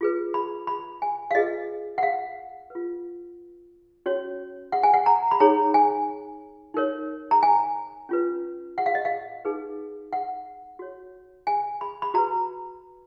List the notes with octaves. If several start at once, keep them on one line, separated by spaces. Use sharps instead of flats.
F4 G#4 B4
B5
B5
G#5
F5
F4 G#4 B4 D#5
F#5
F5
F4 B4
C#4 F#4 C#5
F#5
G#5
F#5
A#5
B5
D#4 G#4 C#5 A#5
G#5
D#4 A#4 C#5
A#5
G#5
C#4 F4 B4
F#5
F5
D#5
F5
D#4 G#4 B4
F#5
F#4 C#5
G#5
B5
B5
F#4 B4 A#5